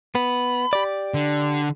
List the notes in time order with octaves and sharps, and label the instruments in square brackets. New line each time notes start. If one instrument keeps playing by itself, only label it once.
[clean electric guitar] B3 [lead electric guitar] B5
[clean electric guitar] G4 D5
[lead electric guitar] D3